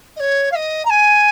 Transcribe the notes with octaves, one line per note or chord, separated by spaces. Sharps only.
D#5
C#5
F5
D#5
A#5
G#5